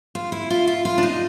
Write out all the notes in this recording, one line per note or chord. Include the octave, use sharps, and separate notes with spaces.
F4
E4
F4
F4
F4
D4
D#4